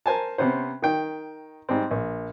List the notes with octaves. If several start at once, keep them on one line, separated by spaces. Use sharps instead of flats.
A#4 C5 G#5 A5
C3 B3 C#4 C5
D#3 G5
G#2 G3 C4
A#1